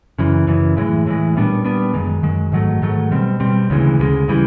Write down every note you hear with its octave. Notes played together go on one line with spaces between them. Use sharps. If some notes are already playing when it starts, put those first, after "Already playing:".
F#2 C#3 E3
F#2 C#3 E3
A2 E3 G#3
A2 E3 G#3
A#2 G3 B3 D4
A#2 G3 B3 D4
F#2 D#3 G#3
F#2 D#3 G#3
G#2 D#3 F#3 A3
G#2 D#3 F#3 A3
B2 G3 C4
B2 G3 C4
D2 C#3 E3 G#3
D2 C#3 E3 G#3
C#3 E3 G3